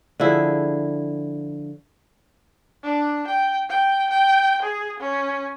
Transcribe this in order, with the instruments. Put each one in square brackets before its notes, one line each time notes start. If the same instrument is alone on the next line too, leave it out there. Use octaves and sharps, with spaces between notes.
[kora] D3 F3 E4 G#4
[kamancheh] D4
G5
G5
G5
G#4
C#4